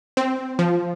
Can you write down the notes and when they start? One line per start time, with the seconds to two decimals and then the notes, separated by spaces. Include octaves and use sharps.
0.17 C4
0.59 F3